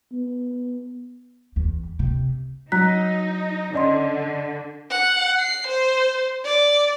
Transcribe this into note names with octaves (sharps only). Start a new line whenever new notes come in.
B3
E2
C3
F#3 D#4 A#5 F#6 B6
D3 C#4 D5 D#5 C6
F#5
C7
C5
D5